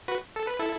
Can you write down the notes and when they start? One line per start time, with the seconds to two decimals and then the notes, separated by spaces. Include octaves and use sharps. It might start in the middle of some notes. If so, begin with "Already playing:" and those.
0.08 F#4 B4
0.36 A4
0.47 B4
0.59 E4 A4